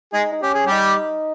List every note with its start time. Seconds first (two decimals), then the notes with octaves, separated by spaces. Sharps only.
0.13 G#3 D#4 G#4
0.32 D#4
0.42 C#4 G4
0.54 G#4
0.66 G3 G4
0.71 D#4